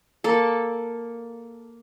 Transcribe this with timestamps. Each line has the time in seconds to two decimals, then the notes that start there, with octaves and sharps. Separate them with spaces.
0.24 A#3 A4